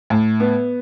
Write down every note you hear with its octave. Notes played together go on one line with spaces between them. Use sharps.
A2
B3